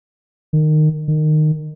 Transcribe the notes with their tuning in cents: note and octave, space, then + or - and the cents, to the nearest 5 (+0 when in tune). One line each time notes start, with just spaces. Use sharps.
D#3 -20
D#3 -20